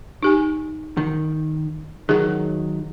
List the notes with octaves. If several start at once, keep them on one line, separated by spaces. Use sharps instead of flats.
D#4 G4 G#5
D#3
D#3 F#3 G#4